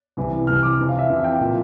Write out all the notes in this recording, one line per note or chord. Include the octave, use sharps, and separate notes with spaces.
C2 C3 E3
C2 C3 E3 F6
D6
F2 C3 E3
F5
E5
F2 C3 E3 F5
G5
A#2 F3 A#3